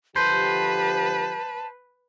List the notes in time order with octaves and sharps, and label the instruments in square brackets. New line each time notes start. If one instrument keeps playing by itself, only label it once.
[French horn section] D3 F3 G4 [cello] B4 [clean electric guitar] C5 [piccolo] A5